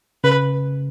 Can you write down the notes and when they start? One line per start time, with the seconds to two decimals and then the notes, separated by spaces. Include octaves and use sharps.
0.24 C#3 B4